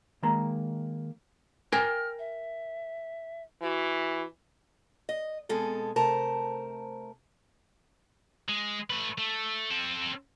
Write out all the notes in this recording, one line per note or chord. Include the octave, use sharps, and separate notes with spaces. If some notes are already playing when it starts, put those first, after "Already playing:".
D#3 G#3 A#3 A#5
A#4 G5 G#5 F6
E5
E3 F#4
D#5
B2 G#3 B3 C4 G#4 A4
C3 A3 A#4 C5 A5
G#3
A3 B4
A3
C4 A4